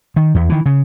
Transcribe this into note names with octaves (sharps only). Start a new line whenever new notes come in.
D#3
E2
D#3 E3
C#3